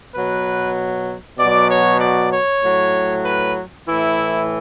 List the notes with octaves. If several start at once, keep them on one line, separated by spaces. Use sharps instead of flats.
B2 F#3 B4
B2 F#3 D5
C#5
D5
C#5
A2 F#3
B4
A2 E3 E4